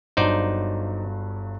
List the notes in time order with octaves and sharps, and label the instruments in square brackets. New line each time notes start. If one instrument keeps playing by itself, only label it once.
[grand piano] G1 G2 F#3 [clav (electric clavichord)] D#4 C5 D5